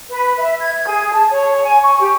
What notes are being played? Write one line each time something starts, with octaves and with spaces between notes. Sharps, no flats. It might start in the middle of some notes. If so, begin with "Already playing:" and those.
B4
E5
G#6
G#4
A5
C#5
G#5
C#6
G4